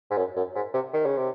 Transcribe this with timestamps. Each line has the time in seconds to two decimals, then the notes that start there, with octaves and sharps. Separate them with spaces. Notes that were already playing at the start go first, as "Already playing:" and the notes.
0.10 G#2
0.17 F#2
0.36 F#2
0.55 G#2
0.74 C3
0.94 D#3
1.06 C#3
1.17 C3